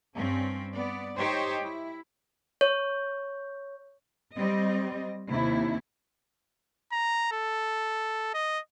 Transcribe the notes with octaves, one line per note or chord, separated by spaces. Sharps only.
G2 C4 C#4
B3 D5
D#4 G4 C5 C#5 D#5
E4
C#5
G3 C4 D#5
D#2 C3 D#3 E4
A#5
A4
D#5